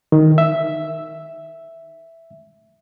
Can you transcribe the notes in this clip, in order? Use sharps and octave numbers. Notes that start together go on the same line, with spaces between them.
D#3
E5